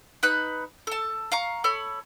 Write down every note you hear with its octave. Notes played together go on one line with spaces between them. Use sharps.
D#4 B4 B5 F#6
A4 A5
F5 A#5 C#6
A4 C#5 B5